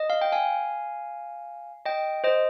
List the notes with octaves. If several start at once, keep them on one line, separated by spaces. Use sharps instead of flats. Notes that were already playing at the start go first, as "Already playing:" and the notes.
Already playing: D#5
F5
G5
F5 G#5
D#5 G5
C5 D#5